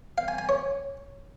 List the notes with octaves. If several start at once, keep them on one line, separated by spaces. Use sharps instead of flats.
F5
G#5
G#5
C#5